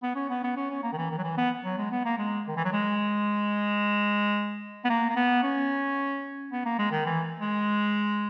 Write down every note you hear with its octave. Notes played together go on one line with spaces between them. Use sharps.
B3
C#4
B3
B3
C#4
C#4
A#3
D#3
E3
D#3
F#3
E3
B3
F#3
G#3
B3
A#3
G#3
D#3
E3
F#3
G#3
B3
A#3
A#3
B3
C#4
B3
A#3
G#3
D#3
E3
G#3